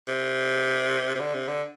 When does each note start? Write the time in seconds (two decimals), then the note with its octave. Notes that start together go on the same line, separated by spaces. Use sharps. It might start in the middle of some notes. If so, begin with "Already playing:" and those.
0.08 C3
1.15 C3
1.20 D3
1.34 C3
1.48 D3